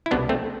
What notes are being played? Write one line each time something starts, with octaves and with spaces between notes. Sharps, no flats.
E4
C2 B2 G3 B3 D4
A3 C4